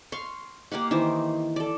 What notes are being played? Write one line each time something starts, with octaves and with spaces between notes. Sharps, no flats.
F5 C6 C#6
A#3 G4 F5 F#5
D#3 E3 D#4 C5
A4 D5